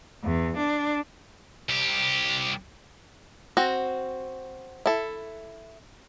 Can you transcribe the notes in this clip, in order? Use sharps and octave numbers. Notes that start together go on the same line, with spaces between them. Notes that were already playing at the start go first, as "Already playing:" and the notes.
E2
D4
C2 G4
C4 F#4
E4 A4